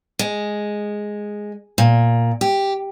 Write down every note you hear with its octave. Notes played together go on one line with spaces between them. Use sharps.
G#3
A#2
G4